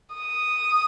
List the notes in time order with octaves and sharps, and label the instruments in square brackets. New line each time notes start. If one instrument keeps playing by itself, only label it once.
[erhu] D#6